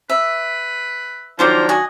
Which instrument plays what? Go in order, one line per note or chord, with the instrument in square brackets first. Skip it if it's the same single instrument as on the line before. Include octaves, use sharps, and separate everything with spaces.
[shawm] B4 [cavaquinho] E5
[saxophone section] D#3 F#3 D4 [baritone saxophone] F3 [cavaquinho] F4 C5 D6 [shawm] A#5
[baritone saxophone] F#4 [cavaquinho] D#5 G#5